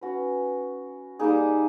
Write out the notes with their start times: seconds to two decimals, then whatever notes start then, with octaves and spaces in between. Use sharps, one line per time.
0.01 C#4 F#4 B4
1.19 G3 A#3 D#4 G#4